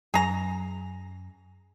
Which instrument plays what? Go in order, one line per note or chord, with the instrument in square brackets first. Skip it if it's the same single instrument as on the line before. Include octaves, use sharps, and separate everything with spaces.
[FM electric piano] F#2 [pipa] G#4 A#5